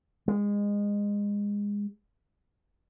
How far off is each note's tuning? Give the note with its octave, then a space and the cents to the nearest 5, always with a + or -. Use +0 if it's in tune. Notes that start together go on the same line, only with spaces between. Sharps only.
G#3 -25